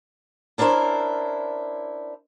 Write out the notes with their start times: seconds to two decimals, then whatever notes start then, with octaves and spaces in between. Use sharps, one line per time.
0.58 C#4 D4 E4 A#4 C5